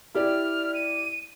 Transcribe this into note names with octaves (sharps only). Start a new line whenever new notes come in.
E4 G4 D5 F6
D#7